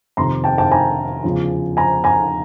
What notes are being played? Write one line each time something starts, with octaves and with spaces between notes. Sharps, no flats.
F2 C3 D#3 A#5 C6
G5 A5
G5 A5
G#5 A#5
E2 C#3 F3
G#5 A#5
G#5 A#5